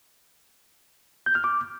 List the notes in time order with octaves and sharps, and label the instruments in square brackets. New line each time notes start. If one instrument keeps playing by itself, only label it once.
[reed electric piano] G6
F6
D6